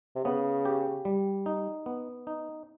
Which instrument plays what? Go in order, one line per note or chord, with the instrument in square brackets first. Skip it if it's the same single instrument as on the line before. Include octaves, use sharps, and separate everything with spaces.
[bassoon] C3
[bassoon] C#3 [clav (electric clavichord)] B3
[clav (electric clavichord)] G4
G3
D#4
B3
D#4